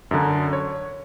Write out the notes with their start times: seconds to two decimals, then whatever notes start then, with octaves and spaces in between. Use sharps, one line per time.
0.11 F#2 D3
0.53 C#5